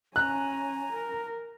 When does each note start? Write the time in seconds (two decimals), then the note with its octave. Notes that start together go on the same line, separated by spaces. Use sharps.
0.16 C#4 G#5 A#5 F#6
0.93 A#4